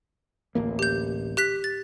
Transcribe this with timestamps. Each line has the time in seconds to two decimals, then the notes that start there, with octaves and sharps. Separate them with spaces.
0.55 D1 A1 A#3
0.79 G4 G6
1.37 G4 F#6 B6
1.64 A6